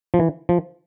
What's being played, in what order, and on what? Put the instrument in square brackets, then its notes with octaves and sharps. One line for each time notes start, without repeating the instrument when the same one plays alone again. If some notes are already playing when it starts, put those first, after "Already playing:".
[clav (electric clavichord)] F3
E3
F3